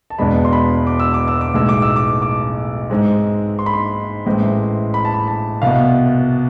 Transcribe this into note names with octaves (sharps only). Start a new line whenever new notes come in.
A5
E1 E2 B2 G#3 D4 B5
C6
B5
D6
E6
D6
E6
D6
B1 A2 G#3 E6
D6
E6
D6
D6
G#2 G#3 C4
C6
B5
C6
A1 A2 G#3 C4
B5
A5
B5
A5
C2 B2 B3 F5